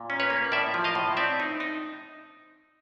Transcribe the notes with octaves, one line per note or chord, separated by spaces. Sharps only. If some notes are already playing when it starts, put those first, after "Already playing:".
Already playing: A#2
C#4
B4 C#5
A#3
A2 D5 E5
F3
D#5 F5
A2
C4 D5 E5
D#4
D#4